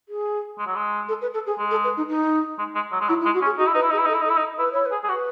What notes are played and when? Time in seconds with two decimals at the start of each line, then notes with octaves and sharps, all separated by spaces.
0.09 G#4
0.58 G#3
0.67 F#3
0.76 G#3
1.08 A4
1.21 B4
1.34 A4
1.46 G#4
1.58 G#3
1.71 A4
1.84 B4
1.97 D#4
2.09 D#4
2.59 G#3
2.75 G#3
2.92 F#3
3.01 G#3
3.09 F#3 E4
3.21 E4
3.25 G#3
3.34 F#4
3.42 C#4
3.45 G#4
3.58 D#4 F#4
3.66 E4
3.74 D#4 B4
3.82 E4
3.90 D#4 G#4
3.98 E4
4.05 D#4
4.08 A4
4.14 E4
4.21 D#4
4.25 A4
4.29 E4
4.37 D#4
4.58 E4 B4
4.72 E4 C#5
4.85 B4
4.92 G#4
5.04 G#4
5.08 F#4 B4